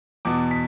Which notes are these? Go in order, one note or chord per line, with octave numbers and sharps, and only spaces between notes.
E2 B2 D6
B6